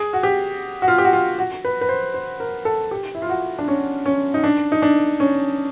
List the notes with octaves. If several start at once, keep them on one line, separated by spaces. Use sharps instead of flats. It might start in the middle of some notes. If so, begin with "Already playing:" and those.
Already playing: G#4
F#4
G4
F#4
F4
G4
F#4
F4
F#4
B4
B4
C5
C5
A#4
A4
G4
E4
F4
F#4
D4
C#4
C#4
D#4
D4
D#4
D4
C#4